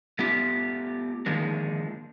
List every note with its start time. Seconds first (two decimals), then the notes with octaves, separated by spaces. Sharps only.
0.19 A3 B3 F4 G4
1.26 D3 D#3 F3 G#3 A#3